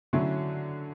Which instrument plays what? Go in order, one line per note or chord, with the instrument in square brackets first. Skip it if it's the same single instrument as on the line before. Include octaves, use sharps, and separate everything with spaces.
[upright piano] D3 F#3 A3 C#4 E4